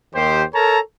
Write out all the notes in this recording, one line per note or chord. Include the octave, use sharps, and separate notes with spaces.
D#2 D#3 G4 C5
A4 A#4 C#5 A5 A#5